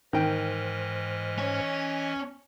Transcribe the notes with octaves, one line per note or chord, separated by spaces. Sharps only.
G#2 D#3 E3 C5 D#5 G5 F6
C#4